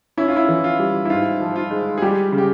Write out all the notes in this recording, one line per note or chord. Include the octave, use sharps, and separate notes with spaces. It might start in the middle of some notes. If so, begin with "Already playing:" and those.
C#4 E4
F4
E4
E3
F4
G3
E4
G#2 F4
F3
F4
G#3
G#4
G3 G4
C#3
G4